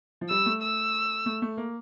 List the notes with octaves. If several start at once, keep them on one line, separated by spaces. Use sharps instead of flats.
F3
G3 E6
A3
E6
A3
A3
A#3